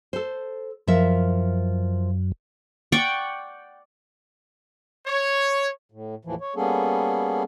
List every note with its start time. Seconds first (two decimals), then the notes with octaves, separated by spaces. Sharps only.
0.13 A4 C5
0.88 F#2 F3 A#4 E5
2.92 D5 F#5 G5 C#6
5.07 C#5
5.91 A2
6.25 D#2 A2 E3 F3
6.41 C#5
6.56 G3 A#3 B3 C#4 G#4 A4